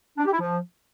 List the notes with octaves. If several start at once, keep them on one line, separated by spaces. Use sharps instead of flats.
D4
G4
E4
F3